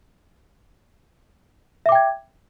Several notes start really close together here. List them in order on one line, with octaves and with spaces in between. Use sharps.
E5 D6 G5 G#6